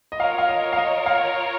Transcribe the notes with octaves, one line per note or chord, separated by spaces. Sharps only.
D#5
F4 A#4 C#5 F5
F5
D#5
F5
D#5
F5